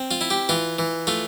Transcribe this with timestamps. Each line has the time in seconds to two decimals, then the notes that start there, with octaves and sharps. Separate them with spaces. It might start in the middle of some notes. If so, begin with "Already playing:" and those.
Already playing: C4
0.11 F4
0.21 E4
0.30 G4
0.49 E3 F4
0.79 E3
1.07 A3 F4